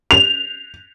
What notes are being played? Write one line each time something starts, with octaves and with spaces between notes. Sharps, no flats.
F7